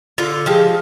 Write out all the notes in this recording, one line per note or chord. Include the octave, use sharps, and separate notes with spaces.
D3 F4
F3 G#3 G4